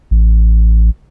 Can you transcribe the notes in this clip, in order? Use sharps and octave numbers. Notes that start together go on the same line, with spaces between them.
A1